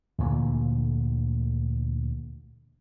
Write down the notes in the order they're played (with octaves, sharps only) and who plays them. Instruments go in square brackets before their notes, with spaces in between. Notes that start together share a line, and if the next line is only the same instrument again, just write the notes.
[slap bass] D2 A#2 D3 E3